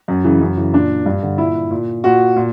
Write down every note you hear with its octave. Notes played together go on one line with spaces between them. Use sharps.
F#2
C#3 E3
F#2
C#3 E3
A#2 D4
G2
D3
A#2 E4
A#2
A#2 F#4
A#2